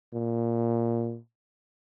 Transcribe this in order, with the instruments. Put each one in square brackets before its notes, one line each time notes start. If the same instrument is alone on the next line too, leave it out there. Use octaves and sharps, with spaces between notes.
[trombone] A#2